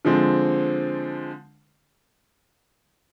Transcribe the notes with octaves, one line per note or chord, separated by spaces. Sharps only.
D3 F3 G#3 C4